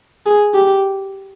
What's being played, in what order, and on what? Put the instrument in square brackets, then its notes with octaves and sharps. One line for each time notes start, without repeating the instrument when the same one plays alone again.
[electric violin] G#4
G4